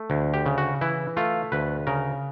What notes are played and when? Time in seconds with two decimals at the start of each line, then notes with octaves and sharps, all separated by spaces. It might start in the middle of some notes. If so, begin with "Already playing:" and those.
Already playing: A3
0.10 D2
0.34 G4
0.46 C#3
0.58 F#4
0.81 E3 E4
1.17 A3 F4
1.52 D2 B4
1.87 C#3 A#4